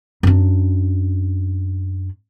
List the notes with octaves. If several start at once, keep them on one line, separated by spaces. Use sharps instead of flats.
F#2 D4